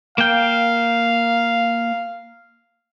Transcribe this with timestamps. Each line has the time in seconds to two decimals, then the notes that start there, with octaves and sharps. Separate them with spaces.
0.18 A#3 F5 G5